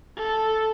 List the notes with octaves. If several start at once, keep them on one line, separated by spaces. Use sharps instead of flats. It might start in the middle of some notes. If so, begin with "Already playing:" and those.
A4